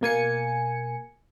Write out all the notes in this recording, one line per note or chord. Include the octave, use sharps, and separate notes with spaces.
B2 A#3 G#5 C#7